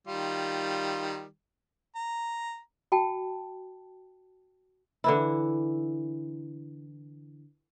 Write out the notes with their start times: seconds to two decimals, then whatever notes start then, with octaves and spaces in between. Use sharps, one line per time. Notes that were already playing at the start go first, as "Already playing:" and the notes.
0.07 D#3 G3 F4
1.95 A#5
2.92 F#4 G5 A5
5.04 D3 E3 E4